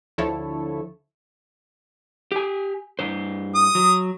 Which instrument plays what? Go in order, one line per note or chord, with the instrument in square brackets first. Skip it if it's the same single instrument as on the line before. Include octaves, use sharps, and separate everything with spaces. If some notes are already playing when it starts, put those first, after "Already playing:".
[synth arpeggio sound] D2 D3 F3 E4 A4 C#5
[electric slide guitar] G4 G#5
G2 C5
[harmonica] D#6
[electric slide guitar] F#3